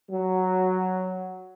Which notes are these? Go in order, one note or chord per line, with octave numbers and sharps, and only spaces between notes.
F#3